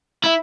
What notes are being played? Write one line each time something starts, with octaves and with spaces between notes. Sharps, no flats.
E4